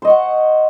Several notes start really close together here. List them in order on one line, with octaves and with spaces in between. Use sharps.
C5 D#5 C#6 F#5